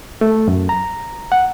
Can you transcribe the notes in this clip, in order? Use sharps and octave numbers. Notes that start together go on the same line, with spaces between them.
A3
F#2
A#5
F#5